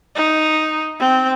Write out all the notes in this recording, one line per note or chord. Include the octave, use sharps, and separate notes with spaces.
D#4
C4